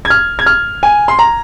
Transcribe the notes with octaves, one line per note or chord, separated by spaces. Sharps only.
G#6
F6
G#6
F6
G#5
C6
A#5